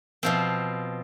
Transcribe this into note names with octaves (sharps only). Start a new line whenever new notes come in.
B2 F3 C4